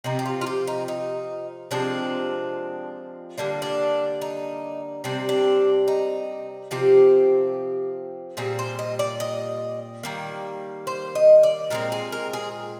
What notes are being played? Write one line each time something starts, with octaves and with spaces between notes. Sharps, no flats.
C3 F3 C4 D#4
G4
F4
F4
G4
D#4
D#4
C3 F3 G#3 C4 D4
D3 G3 A#3 D4
D4
D#4
C3 G3 C4 D4
D4
D#4
C3 F3 C4 G4
A#2 G3 C4 G#4
C5
D#5
D5
D#5
D#3 G3 A#3
C5
D#5
D5
A#2 G#3 C4 A#4
G#4
A#4
G#4